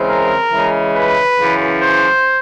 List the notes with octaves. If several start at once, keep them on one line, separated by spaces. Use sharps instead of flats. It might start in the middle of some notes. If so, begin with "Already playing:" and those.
Already playing: C#3 E3 G#3 C4
A#4
C#3 E3 G#3
B4
F#2 C#3 E3
C5